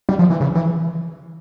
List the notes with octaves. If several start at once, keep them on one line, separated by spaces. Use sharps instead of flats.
G3
F3
E3
C#3
E3